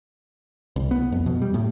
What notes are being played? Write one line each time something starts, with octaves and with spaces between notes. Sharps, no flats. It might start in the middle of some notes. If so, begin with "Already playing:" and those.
C2
B3
F2
B2
G3
A2